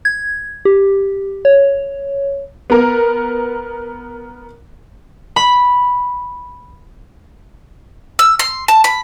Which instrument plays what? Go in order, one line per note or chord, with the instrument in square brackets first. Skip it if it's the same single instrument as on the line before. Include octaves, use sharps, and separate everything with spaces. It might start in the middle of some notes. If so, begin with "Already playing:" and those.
[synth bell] G#6
G4
C#5
[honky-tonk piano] B3 A#4
[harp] B5
[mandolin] E6
C6
A5
B5